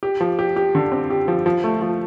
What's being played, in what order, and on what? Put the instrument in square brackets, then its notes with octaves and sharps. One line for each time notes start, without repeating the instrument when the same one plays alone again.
[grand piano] G4
F3
G4
G4
D3
C4
G4
F3
F3
A3
F3